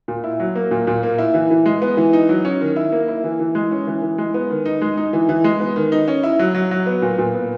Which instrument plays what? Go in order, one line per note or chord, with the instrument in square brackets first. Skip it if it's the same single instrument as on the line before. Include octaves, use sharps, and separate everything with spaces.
[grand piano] A#2
E4
F#3
A#3
A#2
A#2
A#3
E4
E3
E3
G#3
B3
E3
D#4
F#3
C#4
D#3
E4
A#3
E4
E3
E3
G#3
C#4
E3
E3
G#3
B3
D#3
D#4
G#3
D#4
E3
E3
G#3
B3
D#3
D#4
C#4
E4
F#3
F#3
F#3
B3
A#2
A#2
B3